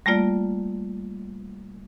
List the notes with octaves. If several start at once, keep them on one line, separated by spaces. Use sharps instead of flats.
G3 A3 A#3 F4 D5